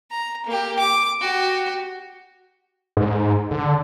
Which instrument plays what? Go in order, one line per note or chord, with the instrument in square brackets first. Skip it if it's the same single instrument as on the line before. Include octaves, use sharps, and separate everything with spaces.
[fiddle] A#5
A#3 G4
D6
F#4 G4
[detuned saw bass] G#2
D3